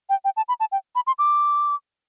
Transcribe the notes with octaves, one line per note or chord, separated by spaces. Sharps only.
G5
G5
A5
B5
A5
G5
B5
C6
D6